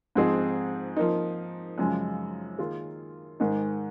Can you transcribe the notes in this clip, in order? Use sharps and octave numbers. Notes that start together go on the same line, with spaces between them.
G#2 F3 C4 D#4 G#4
F3 A#3 D#4
F#2 C#3 F3 G#3
D#3 A#3 F4 G#4
G#2 D#3 G#3 D#4